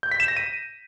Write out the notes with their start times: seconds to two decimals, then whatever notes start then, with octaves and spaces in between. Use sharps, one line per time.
0.03 G6
0.11 B6
0.20 E7
0.28 A#6
0.37 D#7